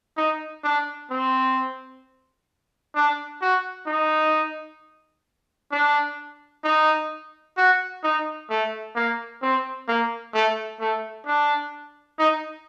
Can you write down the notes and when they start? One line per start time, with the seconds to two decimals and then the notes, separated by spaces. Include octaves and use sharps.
0.17 D#4
0.64 D4
1.11 C4
2.95 D4
3.42 F#4
3.87 D#4
5.71 D4
6.64 D#4
7.57 F#4
8.03 D#4
8.50 A3
8.96 A#3
9.42 C4
9.88 A#3
10.34 A3
10.80 A3
11.26 D4
12.19 D#4